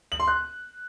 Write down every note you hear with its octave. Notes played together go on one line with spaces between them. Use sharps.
F#7
C6
F#6